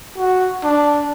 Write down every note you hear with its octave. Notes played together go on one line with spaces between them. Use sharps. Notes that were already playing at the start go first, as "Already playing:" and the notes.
F#4
D4